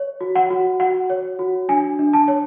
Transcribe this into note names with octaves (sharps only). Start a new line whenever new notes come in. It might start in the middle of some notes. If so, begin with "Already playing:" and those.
Already playing: C#5
F#4
F#5
F#4
F#4 F#5
C#5
F#4
D4 G#5
D4
A5
C#5